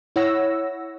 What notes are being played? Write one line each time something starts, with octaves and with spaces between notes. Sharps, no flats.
E4 C#5 F#5 E6 A#6